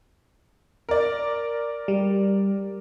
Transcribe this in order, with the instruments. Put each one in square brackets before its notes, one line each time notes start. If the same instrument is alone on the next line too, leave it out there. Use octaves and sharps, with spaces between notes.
[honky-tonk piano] A#4 D5
[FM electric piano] G3